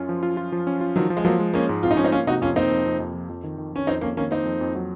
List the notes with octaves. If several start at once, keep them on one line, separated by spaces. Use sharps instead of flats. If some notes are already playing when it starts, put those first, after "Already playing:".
Already playing: F#2 C#4 F4
F3
F4
F4
F3
C#4
F4
D#3 F3 F#3
F3
G#3
F3 F#3 A#3
G#3
G#3 A#3 C#4
G#2
C4 F4
D#4
F3 C#4
C4 D#4
A#3 C#4 F4
C3 D#4 F#4
F2 C#4 F4
A#3 C4 D#4
F2
F2
F2
F3
F2
D#3
D#3
D#3 C#4
F2 C4 D#4
F2 A#3 C#4
D#3 A#3 C#4
A#3 C4 D#4
F2
F2
F#3